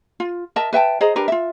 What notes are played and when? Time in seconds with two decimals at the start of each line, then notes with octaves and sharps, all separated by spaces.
0.20 F4
0.56 A#4 D#5 E5 A5
0.73 B4 E5 G5 A5
1.01 G#4 C5 D#5 A#5
1.16 D4 G4 A#4 B4
1.28 F4 E5